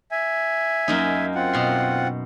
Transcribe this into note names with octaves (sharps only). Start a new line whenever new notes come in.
E5 G#5
F#2 A#3 D#4
C4 F4 F#5
B2 C6